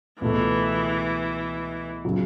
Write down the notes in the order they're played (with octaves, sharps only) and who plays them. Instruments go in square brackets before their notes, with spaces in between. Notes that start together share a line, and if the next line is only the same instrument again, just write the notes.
[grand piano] C#2 B2 A3 [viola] E3
[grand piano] C#3 F#3